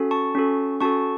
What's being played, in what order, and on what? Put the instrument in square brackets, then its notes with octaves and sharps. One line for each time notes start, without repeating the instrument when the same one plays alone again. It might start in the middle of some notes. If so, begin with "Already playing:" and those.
Already playing: [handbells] C#4 F#4 A4
A5 C#6
C#4 F#4 A4
C#4 F#4 A4 A5 C#6